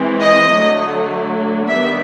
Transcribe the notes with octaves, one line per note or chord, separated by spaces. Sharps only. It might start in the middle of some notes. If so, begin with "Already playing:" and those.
Already playing: E3 G#3 C4
D#5
D3 F#3 A3
D#3 G3 B3 D4 E5